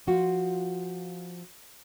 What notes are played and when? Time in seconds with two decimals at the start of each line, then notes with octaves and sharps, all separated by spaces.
0.07 F3 F4 F#4